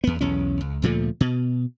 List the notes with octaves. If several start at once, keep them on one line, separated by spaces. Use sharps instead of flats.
E2 B3
B1 E2 C#4
C#2
D2 A#2 F3 A3
B2